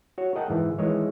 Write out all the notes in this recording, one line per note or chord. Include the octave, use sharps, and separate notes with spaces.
F#4 C#5
G#4 A#4 D#5 F#5 G5 A5
G#2 E3
D#3 E3 G#3 C#5